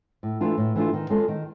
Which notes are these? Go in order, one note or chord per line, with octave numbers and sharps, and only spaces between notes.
A2
E3 A3 D4 F4
A2
E3 A3 D4 F4
D#3
G#3 C#4 F4 A4
D#3